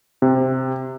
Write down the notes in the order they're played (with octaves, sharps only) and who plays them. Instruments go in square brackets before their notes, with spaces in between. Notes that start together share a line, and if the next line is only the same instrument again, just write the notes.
[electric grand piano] C3